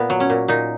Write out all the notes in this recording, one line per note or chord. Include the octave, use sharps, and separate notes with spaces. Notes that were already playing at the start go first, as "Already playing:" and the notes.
Already playing: A#2 B3
F#3
C#4
A#2
A#2 D#4